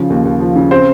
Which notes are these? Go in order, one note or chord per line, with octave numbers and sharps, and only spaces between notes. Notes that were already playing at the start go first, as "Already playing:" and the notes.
Already playing: C#3 F3
D#2
D#2
F3
C#3
C4 C5